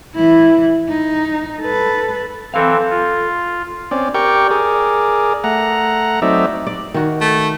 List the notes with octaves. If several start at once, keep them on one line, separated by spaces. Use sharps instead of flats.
E3 E4
D#4
A4 B4
E3 C4 A4 F5
F4
C4 C#4 D5
G4 A#4 D5 G5 C#6
G#4 A#4 D5
A3 F#5 A#5
F#3 A3 C4 D#4 D5 E5
D5
D#3 F#4
A3